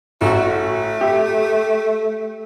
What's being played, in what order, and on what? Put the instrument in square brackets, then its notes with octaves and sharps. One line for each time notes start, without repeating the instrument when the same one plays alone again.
[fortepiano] A1 F#4 [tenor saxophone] A3
[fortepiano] G4 E5